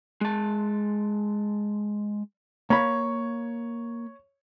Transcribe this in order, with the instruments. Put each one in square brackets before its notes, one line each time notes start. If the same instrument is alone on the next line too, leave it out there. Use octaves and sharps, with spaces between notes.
[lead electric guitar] G#3 A5
[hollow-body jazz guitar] A#3 B5 [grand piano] C#5